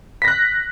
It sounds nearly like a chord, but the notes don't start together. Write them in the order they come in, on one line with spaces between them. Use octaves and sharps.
B6 A#6 F#6